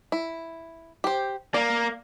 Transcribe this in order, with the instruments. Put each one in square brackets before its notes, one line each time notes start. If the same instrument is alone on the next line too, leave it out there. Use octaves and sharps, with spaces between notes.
[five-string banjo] E4
G4 C5
[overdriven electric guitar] A#3 [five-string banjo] D5